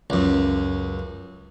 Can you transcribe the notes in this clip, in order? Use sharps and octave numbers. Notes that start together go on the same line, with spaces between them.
C#2 F#2